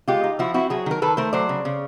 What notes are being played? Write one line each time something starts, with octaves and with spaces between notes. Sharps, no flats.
G#3 F4 G4
D#4
F3 E4 F#4
C4 E4 F#4
F#3 F#4 G#4
D#3 A#4
D#3 A4 B4
A3 A#4 C5
F#3 C5 D5
C#3
C#3